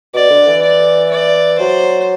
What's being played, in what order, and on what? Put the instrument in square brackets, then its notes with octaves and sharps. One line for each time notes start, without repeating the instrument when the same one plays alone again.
[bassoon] B2 [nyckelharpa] D5
[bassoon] D3
E3
[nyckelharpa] D5
D5
[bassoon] F#3 [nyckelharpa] C5